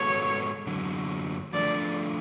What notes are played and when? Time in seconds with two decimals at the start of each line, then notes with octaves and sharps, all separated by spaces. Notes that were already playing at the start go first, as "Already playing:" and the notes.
Already playing: G#2 G#3 B3 F#4 A4 C#5
0.66 F#2 D3 F#3
1.53 F3 A3 D4 D5